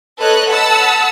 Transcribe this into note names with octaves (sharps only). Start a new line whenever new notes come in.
A4 B4 C#5 D#5 F#6
F#5 A5 B5 E6